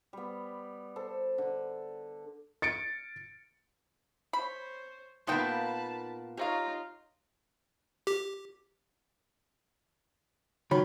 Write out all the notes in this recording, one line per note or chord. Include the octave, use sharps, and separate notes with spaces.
G3 B3
A4 C5
D3
A6 C#7 D7
C5 C#5 B5
A#2 D#3 A#3 B3 D#4 G5 A5 B5
D#4 F4 G4 C#5 F5 A#5
G4
C#2 D#3 F#3 B5